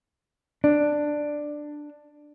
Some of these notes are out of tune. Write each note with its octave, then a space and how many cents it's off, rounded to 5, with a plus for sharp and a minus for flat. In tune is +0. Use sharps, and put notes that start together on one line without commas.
D4 +10